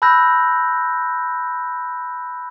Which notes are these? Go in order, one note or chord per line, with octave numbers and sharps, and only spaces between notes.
A5 B5 E6 F#6 G6 A#6